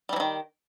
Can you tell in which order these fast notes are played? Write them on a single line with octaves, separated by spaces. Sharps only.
G3 E3 F#3 D#3